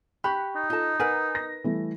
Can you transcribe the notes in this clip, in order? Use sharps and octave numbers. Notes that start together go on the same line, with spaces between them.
G4 B5 C#6 F#6
D#4
F4 A4 D#5 A5
A#4 B4 F#5 G#5 A#5
A#6
E3 G3 A3